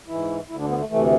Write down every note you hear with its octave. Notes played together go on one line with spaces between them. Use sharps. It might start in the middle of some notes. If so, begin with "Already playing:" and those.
G#2 E3 E4
D2 E4
D3 D4
B3
A3
D2 C3 E3 A3